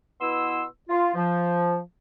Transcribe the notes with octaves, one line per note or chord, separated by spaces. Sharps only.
B2 B3 E4 C6 E6
F4
F3